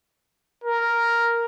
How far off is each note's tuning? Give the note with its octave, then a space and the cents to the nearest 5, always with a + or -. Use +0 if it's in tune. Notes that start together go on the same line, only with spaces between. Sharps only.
A#4 +0